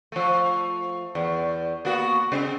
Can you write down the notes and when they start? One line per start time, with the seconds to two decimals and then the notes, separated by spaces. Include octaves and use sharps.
0.12 F3 A3
1.15 E2
1.85 A#3 B3 F#4
2.32 C#3 G#3 C4